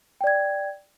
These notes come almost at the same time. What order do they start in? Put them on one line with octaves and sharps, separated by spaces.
G5 D5 G#6